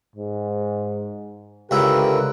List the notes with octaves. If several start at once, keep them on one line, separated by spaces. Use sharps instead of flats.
G#2
C#2 D3 E4 G4 A#4 B4